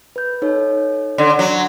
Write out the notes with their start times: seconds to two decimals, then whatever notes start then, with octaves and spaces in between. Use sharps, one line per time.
0.16 B4 G6
0.42 D#4 A4 C#5
1.18 D3
1.39 F#3